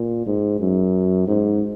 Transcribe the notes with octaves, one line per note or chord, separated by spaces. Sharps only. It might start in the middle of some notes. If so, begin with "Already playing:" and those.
Already playing: A#2
G#2
F#2
G#2